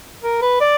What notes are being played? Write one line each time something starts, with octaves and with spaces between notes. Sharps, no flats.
A#4
B4
D5